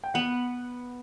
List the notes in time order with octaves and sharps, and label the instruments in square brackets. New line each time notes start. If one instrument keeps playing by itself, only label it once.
[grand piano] G5
[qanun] B3 [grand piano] F#5